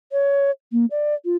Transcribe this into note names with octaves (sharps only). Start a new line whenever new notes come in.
C#5
A#3
D5
F4